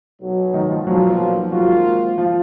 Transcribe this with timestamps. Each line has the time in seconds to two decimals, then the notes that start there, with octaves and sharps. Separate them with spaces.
0.21 B1 B2 F#3
0.54 D#3 D#4
0.70 F3 F4
0.86 B1 A#2 F3 F#3 F#4
1.52 G#1 G#2 F3 F#3 A#3 F4 F#4
2.18 F3 F4